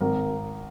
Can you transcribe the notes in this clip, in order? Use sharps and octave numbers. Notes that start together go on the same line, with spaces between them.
G#1 A#4